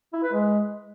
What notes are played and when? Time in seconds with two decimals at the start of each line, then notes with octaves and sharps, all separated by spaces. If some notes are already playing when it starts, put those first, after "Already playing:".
0.13 E4
0.23 B4
0.33 G#3